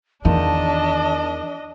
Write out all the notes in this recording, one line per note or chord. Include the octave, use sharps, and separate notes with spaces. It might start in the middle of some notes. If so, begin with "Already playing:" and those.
E2 D#3 E3 D4 D#4 F4 D#5 A5